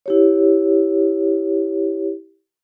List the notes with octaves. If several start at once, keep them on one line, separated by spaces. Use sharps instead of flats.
E4 G4 C#5